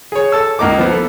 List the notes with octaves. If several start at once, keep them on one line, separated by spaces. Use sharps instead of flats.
G#4 C#5
A4 A5 E6
C#2 A#3 D#4 D6
F3 B3
A4